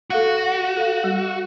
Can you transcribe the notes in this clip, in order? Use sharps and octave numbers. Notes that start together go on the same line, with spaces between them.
F#4 A4 F5 F#5
A4 F5
G3